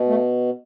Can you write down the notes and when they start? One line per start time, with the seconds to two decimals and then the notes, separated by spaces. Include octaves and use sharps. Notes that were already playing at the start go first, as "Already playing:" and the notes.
Already playing: B2
0.08 A3